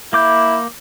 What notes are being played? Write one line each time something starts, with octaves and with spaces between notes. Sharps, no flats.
A#3 E4 D6 G6